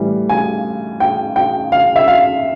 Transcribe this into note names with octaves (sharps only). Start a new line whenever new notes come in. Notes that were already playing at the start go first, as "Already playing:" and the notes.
Already playing: A2 E3 G3
G#5
G5
G5
F5
E5
F5